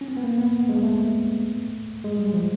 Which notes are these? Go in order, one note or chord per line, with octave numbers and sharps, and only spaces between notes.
C#4
C4
B3
A#3
B3
G#3
A3
G#3
G3
F3